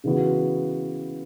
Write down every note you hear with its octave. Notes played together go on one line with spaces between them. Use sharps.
C#3 E3 B3 F#4